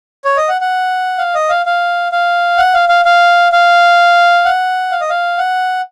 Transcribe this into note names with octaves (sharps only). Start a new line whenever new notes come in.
C#5
D#5
F#5
F#5
F5
D#5
F5
F5
F5
F#5
F5
F5
F5
F5
F#5
F5
D#5
F5
F#5